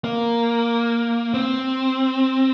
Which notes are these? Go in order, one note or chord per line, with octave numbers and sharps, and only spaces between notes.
A#3
C4